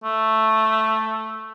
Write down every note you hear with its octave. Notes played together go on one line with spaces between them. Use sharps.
A3